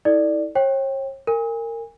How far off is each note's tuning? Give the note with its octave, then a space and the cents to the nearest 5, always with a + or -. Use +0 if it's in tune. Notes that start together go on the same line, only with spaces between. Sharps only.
E4 -40 A4 +0 D5 +10
C#5 -40 G5 +0
A#4 -25 G#5 -30